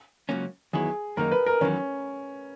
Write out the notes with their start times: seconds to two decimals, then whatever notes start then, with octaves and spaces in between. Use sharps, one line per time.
0.29 C#2 C#3 F#3 A#3 C#4
0.73 E2 D#3 F#3 B3 E4 G#4
1.17 F#2 D#3 A#3 D#4 A#4
1.32 B4
1.47 A#4
1.61 E2 D#3 F#3 C#4